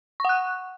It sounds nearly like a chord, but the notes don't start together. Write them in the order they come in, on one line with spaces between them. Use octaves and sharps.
C#6 F#5 F#6